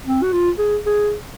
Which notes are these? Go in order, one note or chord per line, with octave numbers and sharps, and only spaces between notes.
C4
F#4
F4
G#4
G#4